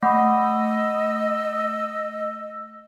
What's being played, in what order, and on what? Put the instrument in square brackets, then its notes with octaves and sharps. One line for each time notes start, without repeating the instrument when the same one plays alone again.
[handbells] A3 [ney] D#5 [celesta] F#5 B5 D#6 [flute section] E6